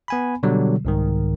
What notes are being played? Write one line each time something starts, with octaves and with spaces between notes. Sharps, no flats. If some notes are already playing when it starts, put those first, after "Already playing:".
B3 G#5 B5
B2 D3 F#3 G3
C2 G#2 D#3